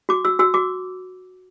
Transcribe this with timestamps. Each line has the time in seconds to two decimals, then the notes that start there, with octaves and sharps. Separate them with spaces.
0.09 F#4 D6
0.25 F#4 E6
0.39 F#4 E6
0.54 F#4 D6